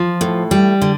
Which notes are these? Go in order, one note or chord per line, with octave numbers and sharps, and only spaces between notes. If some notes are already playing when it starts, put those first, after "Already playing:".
Already playing: F3
A2
G3
D3